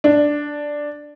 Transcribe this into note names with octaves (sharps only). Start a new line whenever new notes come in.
D4